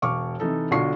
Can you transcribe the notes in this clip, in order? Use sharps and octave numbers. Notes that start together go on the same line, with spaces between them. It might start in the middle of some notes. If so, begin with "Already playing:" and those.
E1 F5 C#6 D6 F6
C3 E3 D#4 A4
B1 D3 F4 C#6 C7